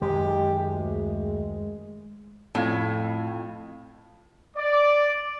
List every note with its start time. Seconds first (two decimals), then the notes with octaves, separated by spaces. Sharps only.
0.02 F#2 D#3 G#3 G4
0.67 D2
2.55 F2 A2 F5 G#6
4.57 D5